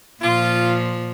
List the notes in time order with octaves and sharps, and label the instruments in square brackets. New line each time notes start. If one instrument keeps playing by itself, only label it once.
[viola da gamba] A#2 F3 [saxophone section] F4